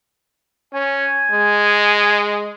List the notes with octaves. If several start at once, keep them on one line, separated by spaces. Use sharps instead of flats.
C#4 G#5
G#3